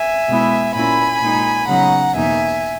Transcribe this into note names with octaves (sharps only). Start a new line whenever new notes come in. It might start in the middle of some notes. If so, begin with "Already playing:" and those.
Already playing: E5 G#5
B2 G#3 B3 E4
A#2 A#3 C#4 E4 G#5 B5
A#2 G#3 D#4
C#3 F#3 B3 D#4 F#5 A#5
E2 B2 A#3 D#4 E5 G#5